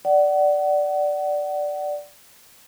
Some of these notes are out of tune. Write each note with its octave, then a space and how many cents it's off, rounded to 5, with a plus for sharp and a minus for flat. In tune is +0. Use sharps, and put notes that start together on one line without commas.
D5 +0 F#5 +30